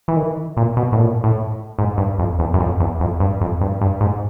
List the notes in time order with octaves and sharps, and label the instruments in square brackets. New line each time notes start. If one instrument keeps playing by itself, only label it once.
[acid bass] E3
D#3
A#2
B2
A2
A#2
A2
G#2
G2
F2
E2
F#2
F2
E2
F2
G2
F2
G2
G2
G#2